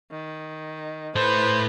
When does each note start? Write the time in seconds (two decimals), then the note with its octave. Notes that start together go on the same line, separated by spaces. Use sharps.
0.11 D#3
1.16 A2 A4 B4 C5